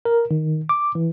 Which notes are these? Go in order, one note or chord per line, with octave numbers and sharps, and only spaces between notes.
A#4
D#3
D6
E3